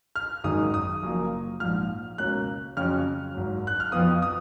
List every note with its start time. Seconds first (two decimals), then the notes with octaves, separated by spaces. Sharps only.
0.16 F6
0.44 G#1 F#2 D#3 G#3 D#4 D#6
0.74 D#6
1.02 F#1 F#2 F3 A#3
1.60 A#1 G#2 F3 F6
2.18 C#2 B2 A#3 C#4 F#6
2.77 F2 C#3 F#3 C#4 F6
3.34 G#1 G#2 F#3
3.67 F#6
3.80 F6
3.92 F2 F3 B3 D#6
4.22 D#6